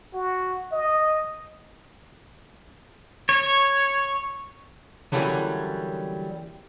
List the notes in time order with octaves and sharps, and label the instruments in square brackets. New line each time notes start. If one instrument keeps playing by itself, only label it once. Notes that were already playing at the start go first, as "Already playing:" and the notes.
[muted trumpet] F#4
D#5
[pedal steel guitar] C#5
[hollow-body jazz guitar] D3 E3 F#3 G3 A#3 C#4